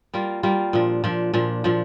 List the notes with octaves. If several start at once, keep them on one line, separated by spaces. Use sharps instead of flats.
G3 A#3 F4
G3 A#3 F4
A#2 F3 D4
A#2 F3 D4
A#2 F3 D4
A#2 F3 D4